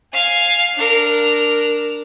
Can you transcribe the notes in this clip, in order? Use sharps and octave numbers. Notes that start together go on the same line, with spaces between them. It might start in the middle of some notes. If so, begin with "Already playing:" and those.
F5 G#5
D4 A#4